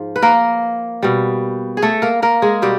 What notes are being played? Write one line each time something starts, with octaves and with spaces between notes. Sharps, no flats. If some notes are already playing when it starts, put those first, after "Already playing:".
Already playing: G#2 F3
B4
A#3 A#4
B2 G3
G#4
A3 A4
A#3 A#4
A#3 A#4
G#3 G#4
B2 G3 G4